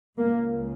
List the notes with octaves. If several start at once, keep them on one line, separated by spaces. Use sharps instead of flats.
C#2 C#3 A#3